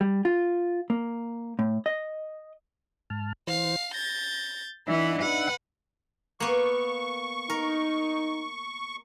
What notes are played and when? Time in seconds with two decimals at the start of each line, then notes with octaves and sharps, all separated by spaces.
0.01 G3
0.25 F4
0.90 A#3
1.59 A2
1.86 D#5
3.10 G#2 A5 F6
3.47 E3 C5 F5 C7
3.94 G6 A6 A#6
4.88 E3 B3 D4 D#4 E5 F#5
5.23 B4 F#5
6.40 A#3 B3 C#6
7.50 D#4 A#4